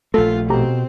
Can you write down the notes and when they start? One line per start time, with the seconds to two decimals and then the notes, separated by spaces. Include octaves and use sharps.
0.14 A#1 A3 F4 A4
0.50 B2 C4 G4 A4 A#5